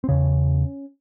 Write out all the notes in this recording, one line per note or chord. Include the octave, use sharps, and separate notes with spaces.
C4
E2 C#3 C#4